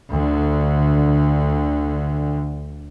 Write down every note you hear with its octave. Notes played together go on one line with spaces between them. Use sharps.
D2 D3